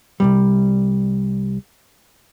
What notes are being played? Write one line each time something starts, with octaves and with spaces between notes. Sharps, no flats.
C2 G2 G3